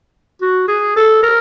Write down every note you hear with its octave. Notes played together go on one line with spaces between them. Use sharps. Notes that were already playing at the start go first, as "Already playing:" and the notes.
F#4
G#4
A4
A#4